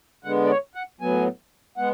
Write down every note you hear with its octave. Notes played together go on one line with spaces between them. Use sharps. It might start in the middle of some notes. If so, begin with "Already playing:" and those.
D3 G#3 B3 F#5
D5
C#5
F#5
A2 F#3 B3 G#5
G#3 B3 F#5